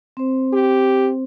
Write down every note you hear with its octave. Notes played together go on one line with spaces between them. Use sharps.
C4 C5
G4